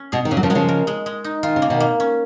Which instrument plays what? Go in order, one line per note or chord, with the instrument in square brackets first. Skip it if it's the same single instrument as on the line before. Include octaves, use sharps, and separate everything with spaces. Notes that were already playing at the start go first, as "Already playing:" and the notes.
Already playing: [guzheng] C#4
[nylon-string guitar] B2 [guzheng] G#4
[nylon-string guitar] D#3
[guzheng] A#2 [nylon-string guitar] C#3
[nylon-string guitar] F#3
C#3 F3
[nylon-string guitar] F#3 [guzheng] G#3
[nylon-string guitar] C#3 F3
[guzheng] A#4
G#3
G#3
D#4
[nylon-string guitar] D#3 [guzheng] F4
[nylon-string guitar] C#3
[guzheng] A#3
[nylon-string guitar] B2 D#3
[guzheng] A#3
C#4